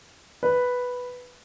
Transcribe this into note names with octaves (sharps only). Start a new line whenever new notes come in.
B4